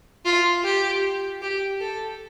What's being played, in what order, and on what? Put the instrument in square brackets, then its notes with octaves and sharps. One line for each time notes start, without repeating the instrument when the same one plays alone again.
[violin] F4
G4
G4
A4